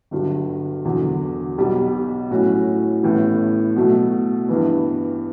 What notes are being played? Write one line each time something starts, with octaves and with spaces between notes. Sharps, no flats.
G1 G2 F#3
E1 E2 D3 F#3
B1 B2 G3
A2 F#3 C#4 F#4
A1 A2 G3 B3
B2 F#3 A3
G2 E3 B3